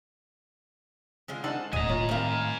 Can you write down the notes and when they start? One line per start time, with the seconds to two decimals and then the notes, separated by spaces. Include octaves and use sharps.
1.28 D3 G#3 F4
1.44 G#3 D4 D#4 A4 C5 F#5
1.73 D1 A2 D#5 G#5 A#5
1.89 A2 F4 C#5
2.09 D#3 G3 C4 A#4 F5